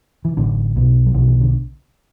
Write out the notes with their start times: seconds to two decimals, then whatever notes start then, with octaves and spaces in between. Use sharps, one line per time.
0.25 E3
0.37 A1 A2 D3
0.76 B1 B2
1.06 F#3
1.14 B1 B2 E3
1.28 E3
1.40 D3